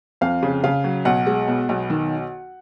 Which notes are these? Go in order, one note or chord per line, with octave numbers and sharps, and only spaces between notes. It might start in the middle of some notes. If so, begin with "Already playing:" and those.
F2 F5
C#3
C#3 F5
F#3
B1 F#5
G#3
B2
B1
D#3